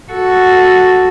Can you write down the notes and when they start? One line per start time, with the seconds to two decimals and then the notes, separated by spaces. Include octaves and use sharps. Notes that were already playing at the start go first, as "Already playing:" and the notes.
0.12 F#4 A4